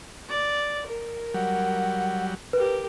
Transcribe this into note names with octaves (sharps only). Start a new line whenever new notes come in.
D5
A#4
F#3 G3 F#5
G4 A#4 B4